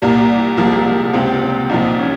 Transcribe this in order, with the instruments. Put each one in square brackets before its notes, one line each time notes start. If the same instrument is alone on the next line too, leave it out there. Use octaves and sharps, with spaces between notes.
[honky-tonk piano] C2 A#2 G3 [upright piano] A#3
[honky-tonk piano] C2 C3 F3 [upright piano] A#3
[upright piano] G#3
A#3
A#3
[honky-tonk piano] C#2 C3 G3 C4 F4
[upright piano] C4
[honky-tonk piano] C2 A#2 F3 [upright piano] D#4
[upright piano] C#4